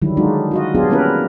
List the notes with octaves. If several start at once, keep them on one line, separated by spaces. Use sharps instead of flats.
D3 D#3 F#3 G3 E4
F#3 G#3 D4 D#4 F4 F#4
F4 F#4 D#5
F#3 B3 D4 F4 G4 G#4
G3 A#3 C#4 E4 A#4 B4